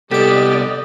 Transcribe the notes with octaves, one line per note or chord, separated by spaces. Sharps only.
C2 B3 G4 A4 D5 D#5 D6